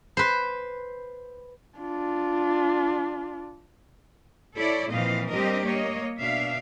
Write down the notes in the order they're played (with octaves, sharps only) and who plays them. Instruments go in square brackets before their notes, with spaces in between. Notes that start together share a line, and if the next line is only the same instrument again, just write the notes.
[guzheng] B4 C5
[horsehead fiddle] D4 F4
[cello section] E4 A4 C#5 D5
A#2 E3 F3 C4 D#5 F5
G3 C4 D4 G4 A#4 D#5
A#3 C#5 D#5
B2 D4 E5 F5